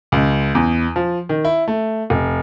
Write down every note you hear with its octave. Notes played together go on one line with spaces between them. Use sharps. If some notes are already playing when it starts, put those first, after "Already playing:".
C#2
E2
F3
D#3
E4
A3
F1